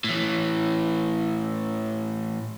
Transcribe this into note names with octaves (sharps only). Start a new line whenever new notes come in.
A2 E3